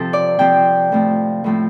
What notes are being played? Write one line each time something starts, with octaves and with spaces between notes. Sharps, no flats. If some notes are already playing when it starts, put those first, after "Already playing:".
Already playing: C3 F3 C4 A4
D5
C3 F3 C4 G5
A2 F3 A3 C4
A2 F3 A3 C4